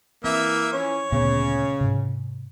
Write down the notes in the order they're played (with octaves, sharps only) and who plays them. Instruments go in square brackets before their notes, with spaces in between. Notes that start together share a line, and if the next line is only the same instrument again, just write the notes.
[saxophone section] E3 [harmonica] A#3 E5 [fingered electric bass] C4
[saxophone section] E3 F3 C#4 [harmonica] C#5
[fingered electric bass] D2 A#2 B3 [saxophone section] C#3
[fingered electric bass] G#2 C3